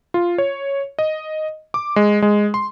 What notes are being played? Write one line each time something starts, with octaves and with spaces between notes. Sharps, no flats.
F4
C#5
D#5
D6
G#3
G#3
C6